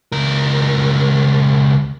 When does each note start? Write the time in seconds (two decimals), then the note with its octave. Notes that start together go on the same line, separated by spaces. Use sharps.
0.12 C#2 A#4